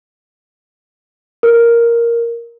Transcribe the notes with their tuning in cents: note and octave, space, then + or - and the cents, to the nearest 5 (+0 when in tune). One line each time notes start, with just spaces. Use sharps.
A#4 +5